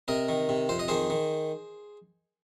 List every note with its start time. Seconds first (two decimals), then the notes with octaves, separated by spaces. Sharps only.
0.08 C3 A#4 D#5
0.29 D#3
0.49 C3
0.69 F2 C5
0.79 D#5
0.88 D#3 G#4 C5
1.10 D#3